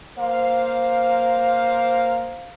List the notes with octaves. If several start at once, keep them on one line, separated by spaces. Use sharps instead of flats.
A#3 C5 F5